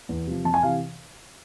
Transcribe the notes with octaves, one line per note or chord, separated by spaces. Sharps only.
E2
C3 F3
F2 A5
G#5
C3 E3 F5